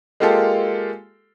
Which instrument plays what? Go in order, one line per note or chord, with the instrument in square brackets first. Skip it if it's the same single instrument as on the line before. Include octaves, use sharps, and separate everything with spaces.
[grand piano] G#3 A#3 F4 G4 A4